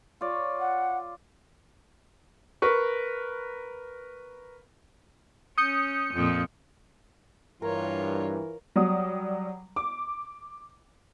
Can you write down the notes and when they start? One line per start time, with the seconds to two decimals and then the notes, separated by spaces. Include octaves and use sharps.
0.21 F4 C#5 D5
0.59 F#5
2.62 A#4 B4 C#6
5.58 C#4 D#6 G6 C#7
6.13 F2 A#2
7.62 G2 E3 F4 A#4 C#5
8.76 F#3 G3 D#6
9.76 D6